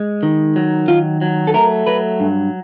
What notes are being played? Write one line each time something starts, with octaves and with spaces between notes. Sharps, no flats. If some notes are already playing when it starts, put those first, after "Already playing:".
Already playing: G#3
D#3
F#3
D#3 F4
F#3
A4
A3 A#4
F#3 B4
G2